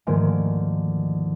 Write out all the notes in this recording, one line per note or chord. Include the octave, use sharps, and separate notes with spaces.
D2 G#2 D#3 F3 A#3 G#5